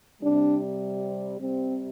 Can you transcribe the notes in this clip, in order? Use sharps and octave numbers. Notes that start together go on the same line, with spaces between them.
C3 G3 D4
C3 G3 C4